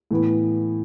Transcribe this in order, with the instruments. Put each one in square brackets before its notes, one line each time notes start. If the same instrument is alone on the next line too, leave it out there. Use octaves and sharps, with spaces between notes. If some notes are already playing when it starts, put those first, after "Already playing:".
[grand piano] A2 E3 B3